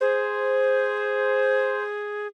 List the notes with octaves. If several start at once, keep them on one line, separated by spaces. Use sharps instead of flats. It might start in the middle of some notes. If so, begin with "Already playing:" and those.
G#4 C5